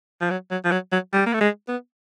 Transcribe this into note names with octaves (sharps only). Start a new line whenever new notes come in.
F3
F#3
F#3
F3
F#3
F#3
G3
A#3
A3
G#3
B3